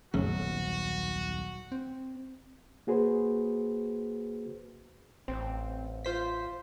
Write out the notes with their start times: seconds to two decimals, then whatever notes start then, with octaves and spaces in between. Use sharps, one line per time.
0.14 D#1 B1 F#2 C#3 A3 F#4
1.72 C4
2.87 A#3 F#4 G#4 B4 C5
5.28 A1 C4
6.05 F4 C5 B6